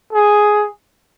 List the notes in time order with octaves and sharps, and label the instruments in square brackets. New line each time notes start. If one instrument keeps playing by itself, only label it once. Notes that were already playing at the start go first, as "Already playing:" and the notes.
[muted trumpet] G#4